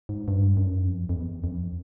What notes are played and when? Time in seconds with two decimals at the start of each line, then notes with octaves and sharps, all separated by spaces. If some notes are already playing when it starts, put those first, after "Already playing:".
0.09 G#2
0.28 G2
0.57 F#2
0.86 F2
1.09 F2
1.15 E2
1.44 F2